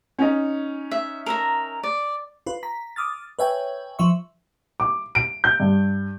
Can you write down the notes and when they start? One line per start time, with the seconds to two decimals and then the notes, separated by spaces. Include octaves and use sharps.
0.19 C#4 D#4
0.91 E5
1.26 A#4 E5 A#5
1.83 D5
2.46 F4 B4
2.63 A#5 B6
2.96 D6 D#6 F6 A6
3.39 B4 C#5 E5 G5 G#5
3.99 F3 E5 C#6
4.80 D6
5.15 D7
5.44 G6
5.60 G2